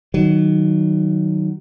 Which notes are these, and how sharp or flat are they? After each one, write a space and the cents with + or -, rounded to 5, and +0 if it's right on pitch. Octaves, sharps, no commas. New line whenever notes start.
D#3 +0 F#3 +15